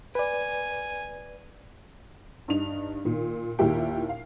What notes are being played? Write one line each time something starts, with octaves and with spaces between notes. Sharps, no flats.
B4 D5 G#5
G2 D4 D#4 F7
A#2 D#3
D#2 A#2 E4 G4 G5
F5